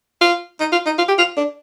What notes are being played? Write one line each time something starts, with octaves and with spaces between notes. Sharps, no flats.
F4
D#4
F4
D#4
F4
G4
F4
D4